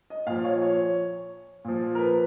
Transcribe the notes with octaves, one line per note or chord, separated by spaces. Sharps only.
D#5
A#2 F3 F5
C#5
C#5
A#2 F3
A#4
B4